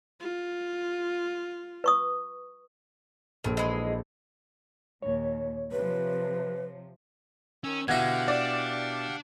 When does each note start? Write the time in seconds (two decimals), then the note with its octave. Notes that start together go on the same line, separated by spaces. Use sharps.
0.20 F4
1.84 B4 C#6 D#6
3.44 A#1 D#3 A4
3.57 E3 G#3
5.02 D#2 A#2 C#5
5.72 C3 F3 B4
7.64 D#3 C#4 E6
7.88 B2 D3 E4 G4 F5 F#5 G#6 A#6
8.28 D4 D5